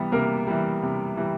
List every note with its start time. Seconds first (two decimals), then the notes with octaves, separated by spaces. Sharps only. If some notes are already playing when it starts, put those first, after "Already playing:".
Already playing: C3 E3 G3 B3
0.12 C3 A#3 A#4
0.47 E3 G3
0.83 C3
1.17 E3 G3